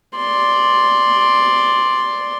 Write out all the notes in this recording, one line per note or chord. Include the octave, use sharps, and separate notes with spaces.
D5 C6